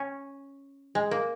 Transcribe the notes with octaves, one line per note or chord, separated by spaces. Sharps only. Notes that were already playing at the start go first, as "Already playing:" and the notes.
Already playing: C#4
G#3
A#3